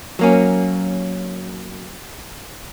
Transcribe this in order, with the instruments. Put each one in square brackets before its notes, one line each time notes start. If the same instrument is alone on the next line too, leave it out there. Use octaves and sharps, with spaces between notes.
[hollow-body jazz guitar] F#3 A#3 C#4